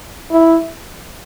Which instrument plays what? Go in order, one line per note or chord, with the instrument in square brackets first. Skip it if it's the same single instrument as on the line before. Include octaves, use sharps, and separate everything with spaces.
[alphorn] E4